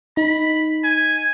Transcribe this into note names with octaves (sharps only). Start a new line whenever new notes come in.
D#4 B5
G#5